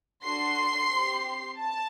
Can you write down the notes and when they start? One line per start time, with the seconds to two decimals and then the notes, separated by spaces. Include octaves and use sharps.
0.24 D4 F#4 A4 C6 C7
0.91 C4 G4
1.58 A5